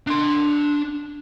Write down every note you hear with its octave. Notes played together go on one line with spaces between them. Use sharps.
D4 C6